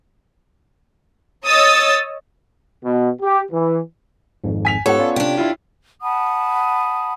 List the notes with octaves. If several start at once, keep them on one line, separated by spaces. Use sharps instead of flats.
C#5 D#5 D#6 E6 A6
B2
G4
E3
G#1 F2 G#2
G#5 B6 F7
G#2 B3 F4 G4 A4 C#5 F#5
C#4 F4 D5
C3 D4 G4
E4 F4
F#5 A5 B5 D#6